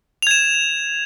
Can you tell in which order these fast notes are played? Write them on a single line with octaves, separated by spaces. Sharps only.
F7 G#6 E7